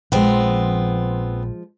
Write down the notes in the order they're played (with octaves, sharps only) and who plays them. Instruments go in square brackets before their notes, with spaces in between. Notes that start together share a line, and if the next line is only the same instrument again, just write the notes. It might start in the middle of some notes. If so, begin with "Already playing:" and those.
[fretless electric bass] A#1 [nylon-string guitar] F3 G#3 [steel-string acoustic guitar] B3 C4